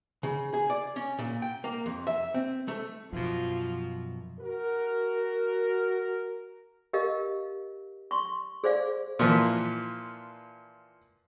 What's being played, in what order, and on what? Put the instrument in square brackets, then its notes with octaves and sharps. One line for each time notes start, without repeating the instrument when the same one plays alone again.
[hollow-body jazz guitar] C#3
G#4
D5
C#4
A#2
G5
A#3
F2
E5
C4
A3
[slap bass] F#2 B2 [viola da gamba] F3
[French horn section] F#4 A#4
[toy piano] G4 A#4 D#5 F5
C6 C#6
G#4 C5 D5 F5
[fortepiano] A#2 E3 F3